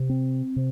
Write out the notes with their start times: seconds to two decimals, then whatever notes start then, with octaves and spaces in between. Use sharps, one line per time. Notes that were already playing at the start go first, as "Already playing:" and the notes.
Already playing: C3
0.09 C4
0.56 C3